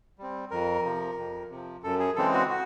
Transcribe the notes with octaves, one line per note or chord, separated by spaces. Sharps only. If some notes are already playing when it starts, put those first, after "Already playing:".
G3 C4
F2 A#4
C3 F3
F2
C3 F3
F#2 A4
G#4
C#3 E3 G#3 C4 A4
F#4
F#4